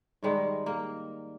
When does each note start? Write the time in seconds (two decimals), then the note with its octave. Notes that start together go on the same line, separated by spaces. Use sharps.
0.23 G#2 D#3 G3 G#3
0.66 A#3